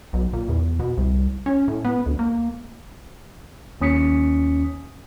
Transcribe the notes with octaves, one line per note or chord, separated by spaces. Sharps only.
B1
A#2
E2
B2
C2
C#4
A2
B3
D2
A#3
D#2 C#4 D#6 B6 C#7